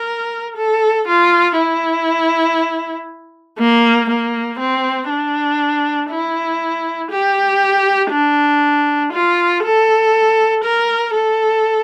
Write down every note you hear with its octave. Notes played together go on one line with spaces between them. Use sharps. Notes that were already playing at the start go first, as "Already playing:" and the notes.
Already playing: A#4
A4
F4
E4
A#3
A#3
C4
D4
E4
G4
D4
F4
A4
A#4
A4